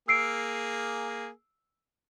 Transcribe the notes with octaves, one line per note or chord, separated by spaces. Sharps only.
A#3 G#4 E6 C7 D7